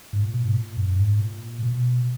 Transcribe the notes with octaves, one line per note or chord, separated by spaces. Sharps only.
G#2
A#2
B2
G#2
A#2
F#2
G#2
A#2
B2